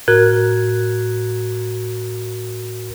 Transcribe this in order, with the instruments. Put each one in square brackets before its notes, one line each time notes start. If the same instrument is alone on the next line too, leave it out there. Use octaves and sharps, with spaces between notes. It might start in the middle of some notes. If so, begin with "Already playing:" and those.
[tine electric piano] A2 F#4 A#4 F#6 G#6